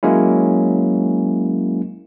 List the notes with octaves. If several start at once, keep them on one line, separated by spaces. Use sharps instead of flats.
F#3 G#3 A#3 C#4 E4